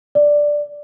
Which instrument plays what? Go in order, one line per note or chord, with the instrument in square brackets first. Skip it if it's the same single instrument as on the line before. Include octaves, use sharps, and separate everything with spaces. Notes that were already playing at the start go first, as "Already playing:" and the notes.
[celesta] D5